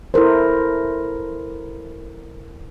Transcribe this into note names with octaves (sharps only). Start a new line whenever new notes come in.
E4 A4 A#4 C5